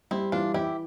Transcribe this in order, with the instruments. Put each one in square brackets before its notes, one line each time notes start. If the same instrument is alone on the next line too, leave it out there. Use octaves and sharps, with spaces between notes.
[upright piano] G3 [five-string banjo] C4 E4
[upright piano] E3 [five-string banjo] D4 F4
[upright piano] E3 [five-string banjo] E4 G4